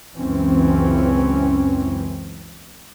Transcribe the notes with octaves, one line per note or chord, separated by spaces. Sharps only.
C#2 F#2 E3 C4 C#4